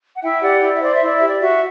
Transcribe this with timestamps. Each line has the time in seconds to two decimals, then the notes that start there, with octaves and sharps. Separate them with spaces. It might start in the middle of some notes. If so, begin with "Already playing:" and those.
0.15 F#5
0.22 E4 E5 G5
0.42 G4 D5 F#5
0.61 E4 D5
0.73 E5
0.81 C5 D5
0.95 E5
1.01 E4 D5
1.17 G4 E5
1.29 D5
1.40 F#4 E5